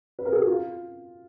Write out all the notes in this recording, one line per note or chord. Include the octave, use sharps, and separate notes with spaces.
B4
A#4
G#4
F#4
F4